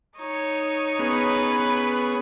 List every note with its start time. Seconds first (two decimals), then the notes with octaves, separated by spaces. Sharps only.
0.18 D#4 C#5
0.99 B3 C#4 G#4 B4